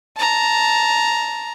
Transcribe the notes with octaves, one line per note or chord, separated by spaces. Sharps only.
A5 A#5